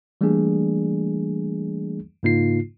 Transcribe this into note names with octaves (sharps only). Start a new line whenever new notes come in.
E3 G3 A3 A#3 D4 G#4
G#2 C#3 A#3 D#4 F4 C7